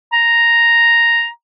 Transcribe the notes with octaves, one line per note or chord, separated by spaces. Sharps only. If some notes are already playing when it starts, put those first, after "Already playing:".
A#5